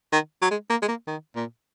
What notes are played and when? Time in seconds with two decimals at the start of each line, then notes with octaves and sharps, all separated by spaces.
0.13 D#3
0.42 F#3
0.51 G#3
0.70 A#3
0.82 G#3
0.89 A#3
1.07 D#3
1.36 A#2